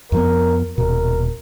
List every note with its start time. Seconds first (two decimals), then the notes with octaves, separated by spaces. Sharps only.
0.12 F2 F3 B3 A#4
0.78 D#1 B2 A#4